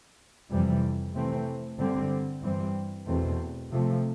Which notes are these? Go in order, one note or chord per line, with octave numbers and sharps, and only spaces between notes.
F2 C3 E3 G3
C3 E3 A3 C4
G2 D3 G3 C4
G2 E3 G3 C4
E2 B2 A3 C4
C3 F3 A3